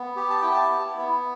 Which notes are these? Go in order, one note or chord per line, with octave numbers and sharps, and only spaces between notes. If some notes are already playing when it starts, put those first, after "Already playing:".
Already playing: B3
G4
A5
E4 G5
A5
B3
B3